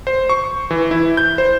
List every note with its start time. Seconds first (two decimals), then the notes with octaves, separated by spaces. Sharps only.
0.07 C5
0.30 C#6
0.71 E3
0.91 E4
1.17 G6
1.38 C5